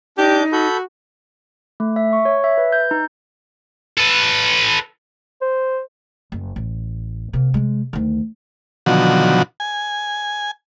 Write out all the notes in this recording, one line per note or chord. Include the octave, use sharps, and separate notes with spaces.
D4 D#4 G4 D6 G6
F#4 A4 B5 G6
A3
E5
C#6
C#5
E5
B4
G6
D#4
A4 B4
C5
F#1
A1
C3 A#3
C3 G#3
D2 D#3
B2 D3 D#3 F3 F#3 F#4
G#5